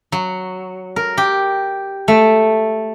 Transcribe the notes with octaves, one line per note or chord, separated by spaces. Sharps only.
F#3
A#4
G4
A3